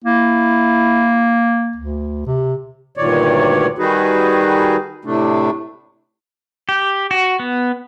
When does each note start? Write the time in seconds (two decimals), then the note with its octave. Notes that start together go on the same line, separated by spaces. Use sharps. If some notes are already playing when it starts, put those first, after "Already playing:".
0.04 A#3 E4
1.76 D2
2.26 C3
2.97 D2 G2 A#2 D#3 C#5 D5
3.78 D#3 G3 D#4 F#4 G#4 B4
5.05 A2 C3 A3 D4
6.69 G4
7.11 F#4
7.40 B3